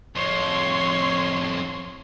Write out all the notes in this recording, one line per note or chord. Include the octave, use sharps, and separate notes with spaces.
F2 A2 C#5 C6